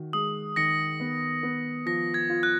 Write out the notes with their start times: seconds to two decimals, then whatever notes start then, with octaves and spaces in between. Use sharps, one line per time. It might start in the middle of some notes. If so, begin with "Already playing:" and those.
Already playing: D#3 F#4
0.13 G#3 D#6
0.56 D#3 A#6 C#7
1.00 B3
1.43 B3
1.86 F3 A#6
2.14 G#6
2.30 F4
2.43 F#6